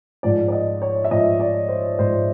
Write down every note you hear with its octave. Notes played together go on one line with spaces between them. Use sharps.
G#2 F3 D5
D5
D#5
C#5
E5
G#2 F3 D#5
D5
C5
G#2 F3 C5